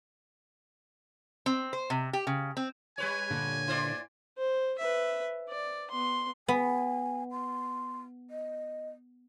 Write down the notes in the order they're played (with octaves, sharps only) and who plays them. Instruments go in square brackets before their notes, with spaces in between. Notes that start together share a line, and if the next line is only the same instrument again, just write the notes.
[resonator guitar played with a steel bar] C4
C5
C3
G4
C#3
C4
[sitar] G3 B4 C#5 [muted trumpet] G#5
[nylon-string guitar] A#2 D3
[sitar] E4 C5 D5
[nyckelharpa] C5
B4 E5
D5
B3 C6
[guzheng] B3 [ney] G#5
[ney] C6
D#5